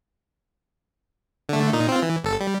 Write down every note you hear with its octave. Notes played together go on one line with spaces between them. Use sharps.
D3 A3
A#2 D#4
C4 F4
E3
G1 A4
G3